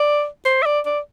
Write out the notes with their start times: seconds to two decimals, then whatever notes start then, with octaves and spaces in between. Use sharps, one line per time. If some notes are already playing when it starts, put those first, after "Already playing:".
Already playing: D5
0.45 C5
0.62 E5
0.66 D5
0.86 D5